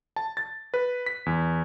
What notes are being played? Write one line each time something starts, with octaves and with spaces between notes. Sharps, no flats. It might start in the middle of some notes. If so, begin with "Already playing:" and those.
A5
A6
B4
B6
E2